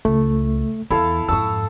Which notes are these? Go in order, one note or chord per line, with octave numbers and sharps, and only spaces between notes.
C#2 A3
E2 E4 A4 F5
F2 G#2 A5 C#6 D#6 E6